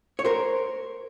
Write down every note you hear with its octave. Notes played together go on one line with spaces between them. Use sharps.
C#5
A#4 C5